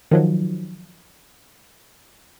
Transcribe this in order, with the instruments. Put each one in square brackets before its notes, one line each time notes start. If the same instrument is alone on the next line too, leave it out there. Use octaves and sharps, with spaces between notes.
[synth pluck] D#3 F3 F#3